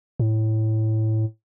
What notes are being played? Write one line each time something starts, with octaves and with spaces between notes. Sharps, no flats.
A2